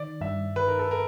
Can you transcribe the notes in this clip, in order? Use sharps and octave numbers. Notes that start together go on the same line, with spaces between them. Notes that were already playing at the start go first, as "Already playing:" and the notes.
Already playing: D#3 D5
G2 E5
D#3 B4
A#4
A4
A#4